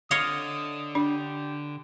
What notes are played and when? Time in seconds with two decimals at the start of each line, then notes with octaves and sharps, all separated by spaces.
0.11 D3 C#5 D#5 F5 D#6
0.95 D4 G4